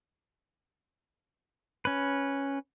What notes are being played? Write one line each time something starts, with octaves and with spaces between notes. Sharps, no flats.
C#4 B4